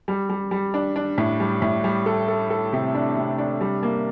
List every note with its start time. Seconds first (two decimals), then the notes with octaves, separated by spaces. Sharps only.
0.08 G3
0.30 G3
0.51 G3
0.74 D4
0.96 D4
1.18 A2
1.40 G3
1.62 A2
1.84 G3
2.06 A4
2.28 A4
2.50 A4
2.73 C3
2.95 D4
3.17 C3
3.38 D4
3.61 G3
3.83 A#3